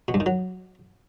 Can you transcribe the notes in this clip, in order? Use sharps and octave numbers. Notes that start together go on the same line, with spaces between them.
B2
G2
D#3
F#3